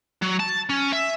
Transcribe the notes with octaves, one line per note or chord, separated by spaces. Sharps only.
F#3
A5
C#4
E5